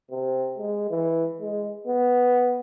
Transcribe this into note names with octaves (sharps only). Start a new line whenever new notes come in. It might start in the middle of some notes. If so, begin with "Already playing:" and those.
C3
G#3
E3
G#3
B3